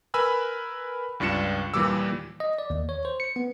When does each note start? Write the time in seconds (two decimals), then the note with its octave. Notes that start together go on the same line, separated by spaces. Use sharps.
0.14 A#4 B4 G#5 B5 E6 F#6
1.20 C#2 G2 D4 F4 C#7 E7
1.74 D#2 A#2 E3 G3 D6 E6
2.40 D#5
2.58 D5
2.70 D#2
2.89 C#5
3.05 C5
3.20 C#7
3.36 B3